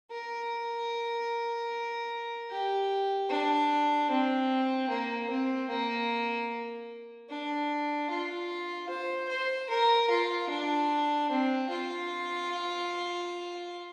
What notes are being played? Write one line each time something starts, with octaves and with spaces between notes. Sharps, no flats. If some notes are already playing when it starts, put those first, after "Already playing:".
A#4
G4
D4
C4
A#3
C4
A#3
D4
F4
C5
C5
A#4
F4
D4
C4
F4